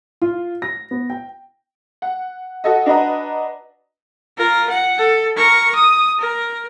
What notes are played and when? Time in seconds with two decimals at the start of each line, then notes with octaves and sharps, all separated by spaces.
0.22 F4
0.62 A#6
0.91 B3
1.10 G5
2.02 F#5
2.64 F#4 A4 D#5
2.86 D4 F#4 B4 D#5 A#5
4.38 F4 A#4
4.70 F#5
4.99 A4
5.36 A#4 C#6
5.75 D#6
6.19 A#4